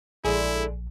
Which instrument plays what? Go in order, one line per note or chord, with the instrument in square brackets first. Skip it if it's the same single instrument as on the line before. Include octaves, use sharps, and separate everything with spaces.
[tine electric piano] A#1 [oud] D3 G#3 [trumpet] E4 [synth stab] G#4